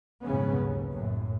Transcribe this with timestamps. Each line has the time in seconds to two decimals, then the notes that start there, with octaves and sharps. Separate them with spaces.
0.24 B1 F2 G#2 C#3 B3 C#4
0.62 D#2
0.91 F#2 A2